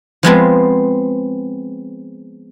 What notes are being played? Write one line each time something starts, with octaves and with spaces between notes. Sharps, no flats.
F3 G#3 B3 C4